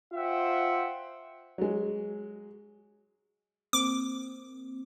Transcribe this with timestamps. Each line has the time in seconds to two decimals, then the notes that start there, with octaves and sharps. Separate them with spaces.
0.13 F4 C5 E5 F#5 G5
1.58 F#3 G#3
3.73 A#3 C4 D6